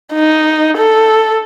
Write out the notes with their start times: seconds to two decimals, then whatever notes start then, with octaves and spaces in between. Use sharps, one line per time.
0.13 D#4
0.77 A4